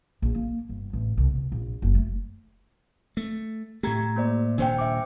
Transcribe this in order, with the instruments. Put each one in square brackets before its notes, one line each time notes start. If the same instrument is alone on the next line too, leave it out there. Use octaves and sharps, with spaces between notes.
[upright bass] A#1
A#3
G1
A1
C2
B1
A#1
F#1
A3
[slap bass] A3
[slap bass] A2 A3 [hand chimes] G4 A#5 G#6
[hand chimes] A#3 C5 D5
[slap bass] D#1 A#2 C#3 [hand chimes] D4 C5 G5
[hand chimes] E5 G5 D6